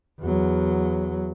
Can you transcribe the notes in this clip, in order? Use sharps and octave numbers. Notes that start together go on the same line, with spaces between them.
E2 F#3